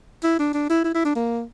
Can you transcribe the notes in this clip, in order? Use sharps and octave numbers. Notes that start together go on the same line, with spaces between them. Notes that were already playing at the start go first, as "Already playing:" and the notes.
E4
D4
D4
E4
E4
E4
D4
A#3